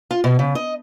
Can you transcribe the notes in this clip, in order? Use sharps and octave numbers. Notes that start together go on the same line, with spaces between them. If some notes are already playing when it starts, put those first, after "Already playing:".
F4
B2
C#3
D#5